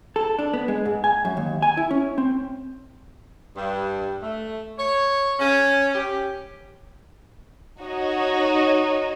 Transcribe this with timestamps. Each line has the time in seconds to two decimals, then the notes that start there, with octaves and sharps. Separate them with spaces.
0.16 A4
0.39 D4
0.53 B3
0.68 G#3
0.85 G#2
1.04 G#5
1.25 F#2
1.37 D#2
1.62 G#5
1.77 E4
1.91 C#4
2.18 C4
3.57 G2
4.23 A3
4.79 C#5
5.40 C#4
5.95 G4
7.80 D#4 F#4 C#5 D#5